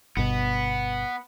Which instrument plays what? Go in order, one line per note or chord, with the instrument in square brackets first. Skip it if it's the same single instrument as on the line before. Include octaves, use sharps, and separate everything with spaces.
[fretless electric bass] G1 B2 [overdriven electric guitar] B3